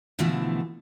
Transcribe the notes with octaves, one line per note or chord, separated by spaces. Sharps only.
B2 D3 E3 F3 A3